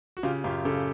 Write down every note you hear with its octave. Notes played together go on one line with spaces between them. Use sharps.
F#4
C#3 F4 G4
F#2 F4 G4
C#3 G4 A4